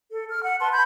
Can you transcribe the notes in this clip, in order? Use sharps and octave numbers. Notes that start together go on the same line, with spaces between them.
A4
F6
F#5
B4 A5 C6
B5 G6